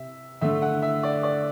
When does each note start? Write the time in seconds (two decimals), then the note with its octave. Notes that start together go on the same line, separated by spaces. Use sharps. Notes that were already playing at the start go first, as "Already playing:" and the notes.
Already playing: C3 E5
0.41 D3 A3 E5
0.62 F#5
0.82 E5
1.03 D5
1.23 D5